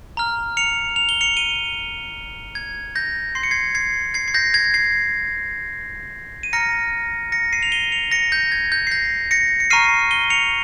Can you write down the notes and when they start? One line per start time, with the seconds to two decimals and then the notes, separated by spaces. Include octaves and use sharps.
0.17 A#5 F6
0.57 C#7 F7
0.96 F7
1.09 G7
1.21 C#7 F7
1.37 D#7 G7
2.55 G#6
2.95 G6 A#6
3.35 C6 G6 C7
3.43 C#7
3.51 G#6 C7
3.75 G#6 C7
4.14 G#6 C7
4.28 C7
4.34 G6 A#6
4.54 G#6
4.74 G#6 C7
6.43 D#7
6.53 A#5 F6 A#6 C#7
7.32 A#6 C#7
7.53 C7 D#7
7.63 F7
7.72 D#7 G7
7.92 C#7 F7
8.11 A#6 C#7
8.32 G6 A#6
8.52 G#6
8.72 G6
8.87 C7
8.91 G6 A#6
9.31 A#6 C#7
9.60 C#7
9.70 A#5 C#6 F6 C7 D#7
10.11 D#7 G7
10.30 C#7 F7